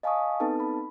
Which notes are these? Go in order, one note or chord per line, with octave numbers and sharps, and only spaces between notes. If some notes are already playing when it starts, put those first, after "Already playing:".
D#5 F5 G#5 A5 C#6 D#6
B3 C4 D#4 A4 B4 A5
B5